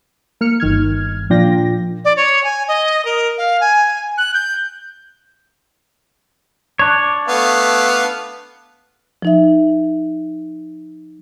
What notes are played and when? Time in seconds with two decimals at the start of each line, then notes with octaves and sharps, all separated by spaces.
0.41 A#3 F6 C#7
0.60 G1 D#3 F6 G#6
1.30 A#2 F3 D4 F4 G5 A#6
2.05 D5
2.17 C#5
2.44 G#5
2.68 D#5
3.05 A#4
3.38 F5
3.61 G#5
4.18 F#6
4.34 G6
6.79 D4 C#5
7.28 A3 B3 F5
9.22 F3 D#4 E5